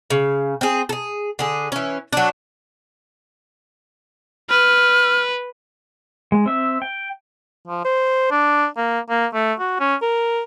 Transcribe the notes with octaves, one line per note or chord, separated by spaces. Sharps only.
C#3
C4 G#4
G#4 A4
D3 G#4
E3 C#4
F#3 D4
B4 F6
G#3
C4 E5
G5
F3
C5
D4
A#3
A#3
A3
F#4
C#4
A#4